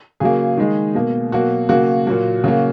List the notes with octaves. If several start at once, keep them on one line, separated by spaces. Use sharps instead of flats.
C#3 F#3 A#3 G#4
D#3 G#3
B2 A#3
B2 F#3 A#3 F#4
C#3 F#3 A#3 F#4
A#2 F#3 A#3
C#3 F#3 A#3 F#4